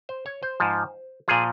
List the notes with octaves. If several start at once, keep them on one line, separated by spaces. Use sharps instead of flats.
C5
C#5
C5
G#2 F3
A#2 F3 G#4